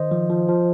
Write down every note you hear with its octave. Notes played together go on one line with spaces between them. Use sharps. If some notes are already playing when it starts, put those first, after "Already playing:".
Already playing: D#3 C5 D#5
F3
F3
F3